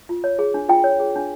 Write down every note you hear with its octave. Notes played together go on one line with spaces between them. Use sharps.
F4
C#5
G#4
D4
F4 G5
C#5
G#4
D4